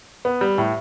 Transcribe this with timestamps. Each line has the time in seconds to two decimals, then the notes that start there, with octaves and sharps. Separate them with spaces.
0.25 B3
0.41 G3
0.58 A2